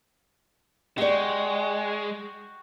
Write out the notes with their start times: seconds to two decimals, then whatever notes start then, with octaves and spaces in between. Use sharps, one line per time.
0.98 G#3 F#4 G4 D5 G5 C#6